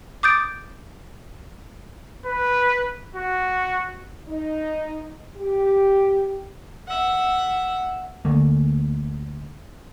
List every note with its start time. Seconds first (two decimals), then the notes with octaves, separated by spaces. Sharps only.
0.23 D6 D#6 G6 A6 D7
2.26 B4
3.15 F#4
4.28 D#4
5.37 G4
6.88 E5 F#5
8.25 D2 D3 A3 A#3